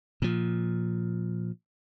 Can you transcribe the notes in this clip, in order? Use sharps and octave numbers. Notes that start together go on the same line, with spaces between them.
A#2 F3